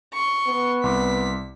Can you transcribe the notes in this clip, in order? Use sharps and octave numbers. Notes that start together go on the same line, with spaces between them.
C6 C#6
B3
C2 C6 D6 B6